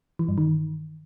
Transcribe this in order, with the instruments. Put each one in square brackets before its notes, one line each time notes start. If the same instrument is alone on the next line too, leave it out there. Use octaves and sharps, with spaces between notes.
[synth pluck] E3
G2
D#3